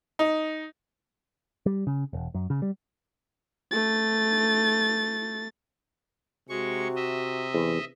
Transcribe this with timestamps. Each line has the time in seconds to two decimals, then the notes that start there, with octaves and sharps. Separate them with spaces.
0.19 D#4
1.66 G3
1.87 C#3
2.13 E1
2.34 F#2
2.50 C#3
2.62 G3
3.71 A3 A6
6.49 C3 G#3 F#4 C#6
6.96 D#5 E5
7.54 E2